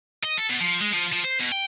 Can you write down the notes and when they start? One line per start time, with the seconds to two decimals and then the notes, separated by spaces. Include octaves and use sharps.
0.24 D#5
0.38 A4
0.50 B2
0.61 F3
0.80 G#3
0.92 F3
1.12 F3
1.24 C5
1.39 B2
1.52 G5